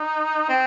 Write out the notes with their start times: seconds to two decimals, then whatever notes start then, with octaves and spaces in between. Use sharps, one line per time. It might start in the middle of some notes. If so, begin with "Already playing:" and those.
Already playing: D#4
0.50 C4